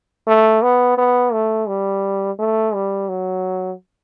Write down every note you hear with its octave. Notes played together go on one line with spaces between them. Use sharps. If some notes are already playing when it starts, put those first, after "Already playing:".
A3
B3
B3
A3
G3
A3
G3
F#3